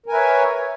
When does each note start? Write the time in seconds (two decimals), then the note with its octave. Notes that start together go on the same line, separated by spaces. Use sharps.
0.06 A#4
0.09 G#5
0.11 B4
0.14 E5
0.16 C#5